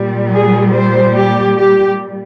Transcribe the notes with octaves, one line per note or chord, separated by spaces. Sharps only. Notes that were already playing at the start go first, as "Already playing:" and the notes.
Already playing: A#2 G3
G#4
C5
G4
G4